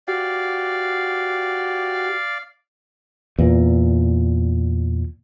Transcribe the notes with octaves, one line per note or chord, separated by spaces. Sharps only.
F#4 G4 D5 F5
E2 A#2